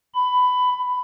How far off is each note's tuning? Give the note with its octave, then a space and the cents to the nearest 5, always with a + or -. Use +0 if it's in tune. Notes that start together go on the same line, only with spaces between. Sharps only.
B5 +15